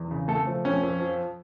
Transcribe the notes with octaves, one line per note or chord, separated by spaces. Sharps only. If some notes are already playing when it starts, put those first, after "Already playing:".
Already playing: E2
C#3
A3 A4
F3
F2 C#4
F2
F3